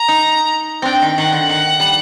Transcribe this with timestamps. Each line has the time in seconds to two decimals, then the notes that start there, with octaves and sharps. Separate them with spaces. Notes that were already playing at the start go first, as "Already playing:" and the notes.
Already playing: A#5
0.08 D#4
0.82 C4 D4 G5
1.02 D#3
1.18 D#3 F#5
1.32 D3
1.49 D#3 F#5
1.80 G3